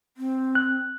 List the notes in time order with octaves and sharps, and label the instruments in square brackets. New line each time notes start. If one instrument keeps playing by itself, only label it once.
[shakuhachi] C4
[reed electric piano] F#6